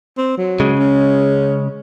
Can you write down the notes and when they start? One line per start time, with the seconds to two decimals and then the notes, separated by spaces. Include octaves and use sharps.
0.18 C4
0.38 F#3
0.60 C#3 G#3
0.79 C#4